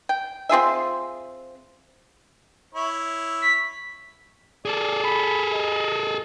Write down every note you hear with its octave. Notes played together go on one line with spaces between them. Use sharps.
G5
C4 F4 G#4 E5
E4 C#5
B6
G#4 A4 D5
B5
D#5